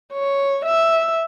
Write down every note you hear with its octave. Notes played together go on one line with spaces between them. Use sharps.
C#5
E5